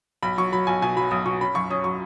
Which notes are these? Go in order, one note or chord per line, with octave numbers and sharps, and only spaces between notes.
B1 B5
F#3 C#6
F#3 B5
B1 G#5
B2 G#5
F#3 B5
B1 D#6
B2 C#6
C#4 B5
F#2 C#6
C#4 D#6
F#3 C#6